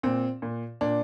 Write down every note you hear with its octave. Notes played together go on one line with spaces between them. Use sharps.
A#2 C4
A#2
A#2 D4